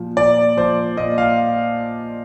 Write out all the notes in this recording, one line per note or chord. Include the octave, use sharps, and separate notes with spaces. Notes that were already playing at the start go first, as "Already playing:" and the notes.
Already playing: A#2 F3
A#2 D5
F3 C5
A#2 D#5
F5